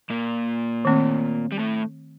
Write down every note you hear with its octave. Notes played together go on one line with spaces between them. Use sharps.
A#2 A#3
D#3 A3 C4
G3
A2 A3